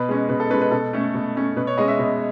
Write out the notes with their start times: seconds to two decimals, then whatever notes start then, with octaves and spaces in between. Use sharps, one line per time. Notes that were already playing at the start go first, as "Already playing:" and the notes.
Already playing: B2 B4
0.09 G#3 C#4
0.29 B2 B4
0.40 A4
0.50 C#4 B4
0.53 G#3
0.62 B4
0.71 B2 A4
0.93 A3 C#4
1.14 B2
1.36 A3 C#4
1.56 B2 B4
1.67 C#5
1.78 G#3 C#4 D#5
1.88 E5
1.99 B2